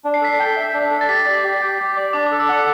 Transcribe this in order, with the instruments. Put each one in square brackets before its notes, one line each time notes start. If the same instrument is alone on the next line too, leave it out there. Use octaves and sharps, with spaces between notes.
[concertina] D4
[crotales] C7
[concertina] A4 [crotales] B6
[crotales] C7
[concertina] G5
E5
D4
A4
[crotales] A6
[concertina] G4 [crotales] B6
[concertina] D5
G4
G5
G4
D5
[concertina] D4 [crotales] D6
[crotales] D6
[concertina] A4
[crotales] E6
[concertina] F#5 [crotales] D6